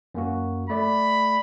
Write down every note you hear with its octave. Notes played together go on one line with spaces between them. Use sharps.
F#2 A#3 F#4
A3 D5 B5